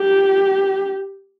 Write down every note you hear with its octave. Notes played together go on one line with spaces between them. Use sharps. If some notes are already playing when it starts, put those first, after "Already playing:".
Already playing: G4